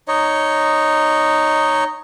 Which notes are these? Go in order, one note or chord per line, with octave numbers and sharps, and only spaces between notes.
D#4 C#5 D#5